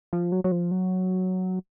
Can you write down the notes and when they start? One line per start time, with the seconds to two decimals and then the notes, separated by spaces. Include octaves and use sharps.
0.13 F3
0.32 F#3
0.44 F#3
0.52 F3
0.71 F#3